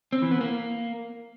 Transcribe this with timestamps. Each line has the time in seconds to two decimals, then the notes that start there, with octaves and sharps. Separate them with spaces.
0.13 C4
0.22 E3
0.31 B3
0.41 A#3